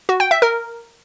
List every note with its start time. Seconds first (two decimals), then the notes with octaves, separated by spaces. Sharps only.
0.09 F#4
0.20 G5
0.31 E5
0.42 A#4